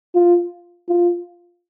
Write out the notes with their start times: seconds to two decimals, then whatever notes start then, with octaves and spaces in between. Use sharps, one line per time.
0.15 F4
0.89 F4